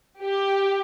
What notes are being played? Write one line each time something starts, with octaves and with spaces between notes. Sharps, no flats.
G4